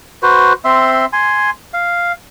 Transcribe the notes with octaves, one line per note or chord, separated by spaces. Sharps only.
F#4 B4 C5
C4 E5 C6
G#5 C6
F5